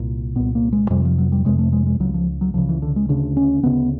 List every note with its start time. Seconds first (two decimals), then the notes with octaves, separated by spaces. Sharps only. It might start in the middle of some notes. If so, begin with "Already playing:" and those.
Already playing: C2 A#2
0.36 C2 A#2 B3
0.55 A#3
0.72 G#3
0.90 F2 C3 G3
1.05 F3
1.18 F#3
1.32 G3
1.45 F2 C3 G#3
1.59 A3
1.72 G#3
1.87 G#3
2.00 C#2 C#3 F#3
2.14 F3
2.41 F#3
2.54 C#2 C#3 F3
2.69 E3
2.82 D3
2.96 G#3
3.09 D2 C#3 D4
3.37 C#4
3.63 D2 C#3 B3